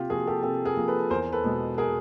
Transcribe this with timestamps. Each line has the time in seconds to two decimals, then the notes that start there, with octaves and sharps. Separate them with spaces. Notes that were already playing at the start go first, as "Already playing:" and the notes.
Already playing: C3 F4 G4
0.10 F3 A#3 F#4 G#4
0.27 G4 A4
0.43 C3 G4 A4
0.65 G#4 A#4
0.77 F3 A#3
0.88 A4 B4
1.10 E2 A#4 C5
1.32 A4 B4
1.44 B2 G#3
1.78 G#4 A#4